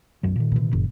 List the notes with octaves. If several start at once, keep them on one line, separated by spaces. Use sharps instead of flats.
B1 F#2 F#3
A#2 D#3
C3 E3
F#1